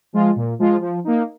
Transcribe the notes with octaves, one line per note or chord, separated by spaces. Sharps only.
F3 G#3 F4
A#2
F3 G#3 F4
F3
A#3 D#4